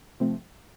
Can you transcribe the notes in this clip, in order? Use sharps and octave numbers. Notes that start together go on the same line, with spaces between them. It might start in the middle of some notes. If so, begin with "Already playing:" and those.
C3 F3 A3 C4